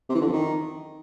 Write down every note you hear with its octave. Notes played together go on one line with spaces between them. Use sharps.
C3
E3
D3
F2
D#3